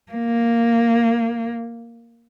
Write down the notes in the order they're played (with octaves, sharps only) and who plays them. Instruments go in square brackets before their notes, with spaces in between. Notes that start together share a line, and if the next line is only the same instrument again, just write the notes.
[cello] A#3